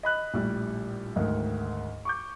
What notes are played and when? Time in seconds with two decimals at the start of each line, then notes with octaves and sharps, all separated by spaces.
0.03 D#5 B5 F#6
0.34 A#1 A2 G3
1.16 D2 G#2 D#3
2.05 C#6 D6 G6